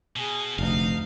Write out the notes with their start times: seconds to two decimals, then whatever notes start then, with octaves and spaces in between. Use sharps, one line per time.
0.16 B2 G#4
0.59 F1 D2 D#4 F5